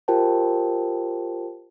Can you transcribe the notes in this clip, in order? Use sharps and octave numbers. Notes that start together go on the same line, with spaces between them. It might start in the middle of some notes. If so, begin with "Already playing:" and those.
F4 G4 A#4 C5 G5 A5